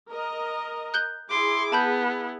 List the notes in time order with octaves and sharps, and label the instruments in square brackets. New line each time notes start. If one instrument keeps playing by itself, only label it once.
[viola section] A#4 D#5
[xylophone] F#6 G6 G7
[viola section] E4 G#4 [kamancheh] C6 D6
[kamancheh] B3 [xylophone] A5 B5 G6